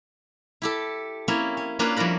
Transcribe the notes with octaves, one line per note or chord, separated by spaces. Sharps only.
E4 G4 A4
A#3 C4 C#4 E4
C#4
A#3 C#4 D4 F4 B4
F2 G3 E4 A#4 B5